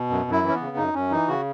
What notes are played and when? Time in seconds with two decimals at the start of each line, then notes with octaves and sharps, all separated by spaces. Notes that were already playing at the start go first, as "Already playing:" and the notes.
Already playing: B2
0.10 F#2
0.26 F#2
0.31 E4
0.43 E3
0.48 C#4
0.55 B3
0.60 C#3
0.77 F#2 D#4
0.94 F#2 C#4
1.11 E3 D#4
1.28 C#3 F#4